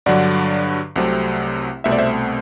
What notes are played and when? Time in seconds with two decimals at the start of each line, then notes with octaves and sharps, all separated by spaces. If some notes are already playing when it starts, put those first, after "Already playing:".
0.06 G2 D3 F#3 D5 F#5
0.96 C2 C3 F#3 A3 C4
1.84 C2 B2 A3 C4 E5
1.92 D5
1.98 C5 E5